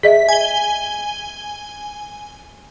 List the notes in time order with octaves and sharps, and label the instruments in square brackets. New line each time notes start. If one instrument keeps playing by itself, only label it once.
[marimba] G#4 D#5 E5 [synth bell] B6
[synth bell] G#5 G7